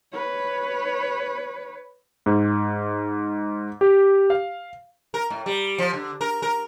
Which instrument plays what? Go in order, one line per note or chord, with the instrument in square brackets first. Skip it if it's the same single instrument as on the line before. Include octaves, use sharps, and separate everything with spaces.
[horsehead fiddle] B4 C#5
[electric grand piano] G#2
G4
F5
[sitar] A#4
A2
G3
F3
D3
A#4
A#4